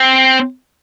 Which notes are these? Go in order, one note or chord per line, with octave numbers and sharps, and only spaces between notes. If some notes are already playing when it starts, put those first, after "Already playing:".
Already playing: C4